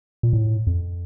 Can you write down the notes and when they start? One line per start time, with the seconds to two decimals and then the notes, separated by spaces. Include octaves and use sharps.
0.23 A#2
0.33 A2
0.67 F2